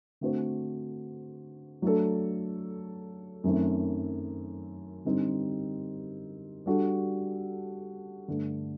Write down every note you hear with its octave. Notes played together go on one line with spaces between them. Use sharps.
D3 A3 C4 F#4 C5
F#3 A3 D4 A4
F#2 D#3 F#3 A3 C4
D3 G3 C4 D#4
G3 D4 F#4 A4
G2 D3 A3 D4